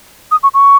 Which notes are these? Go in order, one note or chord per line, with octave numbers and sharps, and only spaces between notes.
D#6
C#6
C#6